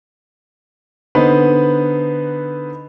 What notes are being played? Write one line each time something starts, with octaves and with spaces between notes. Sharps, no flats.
D3 B3 D#4 B4 C5